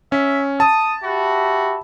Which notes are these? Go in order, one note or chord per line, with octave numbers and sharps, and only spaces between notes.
C#4 E5
A5 D#6
F#4 G4 E5 B5